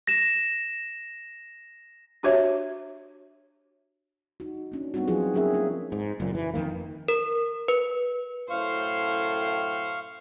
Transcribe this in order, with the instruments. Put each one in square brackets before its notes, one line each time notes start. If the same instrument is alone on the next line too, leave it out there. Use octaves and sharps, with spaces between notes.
[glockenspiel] A#6 E7
[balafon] D4 F#4 G4 C#5 E5
[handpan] D#4 F#4
A#3 C#4 D4
G3 B3 C4 D#4 F#4
F3 F#3 C4 F4 G#4
F#3 A#3 C#4 G#4 A#4 E5
A#3 C#4 D4 F4
[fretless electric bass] G#2
F#1 F#2 A#2
E3
F2 D#3 A#3
[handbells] A#4
B4
[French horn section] F#2 A2 [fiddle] C5 [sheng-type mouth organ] F5 C#6